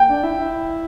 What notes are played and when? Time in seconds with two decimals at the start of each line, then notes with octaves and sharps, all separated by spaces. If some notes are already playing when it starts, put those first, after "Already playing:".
Already playing: G5
0.09 D4
0.24 E4
0.38 E4